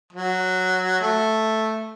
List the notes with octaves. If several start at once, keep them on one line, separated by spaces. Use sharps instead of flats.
F#3
A3